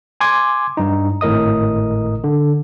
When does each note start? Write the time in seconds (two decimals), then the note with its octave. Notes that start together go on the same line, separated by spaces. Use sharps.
0.21 G#5 C6 D6 G#6
0.77 G2 D#4
1.21 G#1 A2 A#4 D#5 D#6
2.24 D3